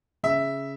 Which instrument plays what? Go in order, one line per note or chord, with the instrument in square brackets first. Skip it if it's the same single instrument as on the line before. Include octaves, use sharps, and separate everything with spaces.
[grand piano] C#3 E5